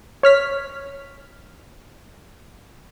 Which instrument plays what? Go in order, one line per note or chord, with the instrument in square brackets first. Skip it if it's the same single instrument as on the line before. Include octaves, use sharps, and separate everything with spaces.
[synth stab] C#5 F6 B6